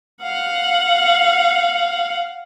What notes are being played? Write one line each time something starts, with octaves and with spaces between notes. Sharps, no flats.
F5 F#5